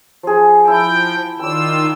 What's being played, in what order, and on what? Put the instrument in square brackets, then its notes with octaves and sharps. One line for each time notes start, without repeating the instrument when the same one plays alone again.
[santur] F3 G#4
[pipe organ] F3 G5 [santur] E4 A5
[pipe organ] D#3 F4 E6 [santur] D5 G5